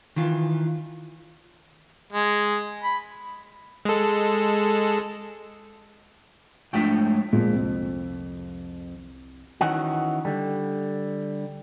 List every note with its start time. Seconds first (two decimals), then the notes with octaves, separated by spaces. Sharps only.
0.16 D#3 E3 F4
2.13 G#3
2.83 B5
3.85 G#3 A4
6.73 G#2 F3 A3 D4 G5 B6
7.33 F2 A#2 G#3
7.53 C2
9.61 D#3 E3 C#4 D#4 F#4
10.25 D3 G3